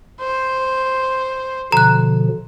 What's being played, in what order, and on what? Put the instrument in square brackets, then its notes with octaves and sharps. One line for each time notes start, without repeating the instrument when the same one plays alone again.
[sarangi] C5
[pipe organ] B2 D3 F3 [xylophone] A#5 F#6